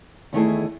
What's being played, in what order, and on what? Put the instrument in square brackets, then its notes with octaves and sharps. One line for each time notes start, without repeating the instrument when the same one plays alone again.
[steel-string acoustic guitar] E2 D#3 A3 E4 G#4